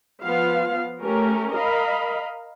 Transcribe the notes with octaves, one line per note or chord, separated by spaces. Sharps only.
F3 B3 F4 F5
A3 C#4 G4 A#4
A#4 D#5 F5 B5